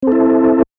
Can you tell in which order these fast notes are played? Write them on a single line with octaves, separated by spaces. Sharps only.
C4 A4 E4